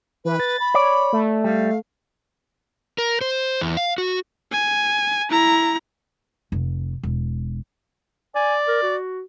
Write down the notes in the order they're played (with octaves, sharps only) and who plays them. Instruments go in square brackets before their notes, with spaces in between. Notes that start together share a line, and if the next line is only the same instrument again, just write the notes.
[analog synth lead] E3 [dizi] B4
[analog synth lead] A6
[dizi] B5
[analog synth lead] C#5 [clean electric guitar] D5
[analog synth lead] A3
[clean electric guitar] G3 [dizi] F5
[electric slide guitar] A#4
C5
E2
F5
F#4
[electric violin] G#5
E4 A#5
[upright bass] F1
E1
[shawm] D5 [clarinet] G#5
[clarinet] A#4
F#4